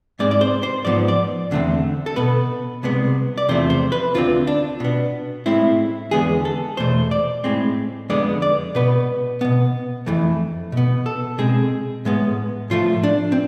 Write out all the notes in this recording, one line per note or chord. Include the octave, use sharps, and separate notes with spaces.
G#2 G#3 C4 D5
D5
C5
C5
G#2 F3 B3 D5
D5
E2 D3 A3 C4
A4
B2 B3 B4
C2 C3 G#3 B3
D5
E2 C3 F3 A3 C4 C5
C5
B4
D2 D3 A3 C4 F4
D4
B2 B3
A2 G#3 C4 E4
E2 D3 G#3 B3 G#4
A4
E2 B2 A3 C5
D5
A2 G#3 C4
F2 D3 G#3 B3 D5
D5
B2 B3 B4
B2 B3
F2 E3 A3
B2 B3
A4
B2 G#3 C4 G#4
A2 G#3 B3
A2 F3 A3 F4
D4
C4